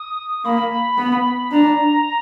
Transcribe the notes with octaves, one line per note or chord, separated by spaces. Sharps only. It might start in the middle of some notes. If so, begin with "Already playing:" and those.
Already playing: D#6
A#3 B5
B3
D4 A#5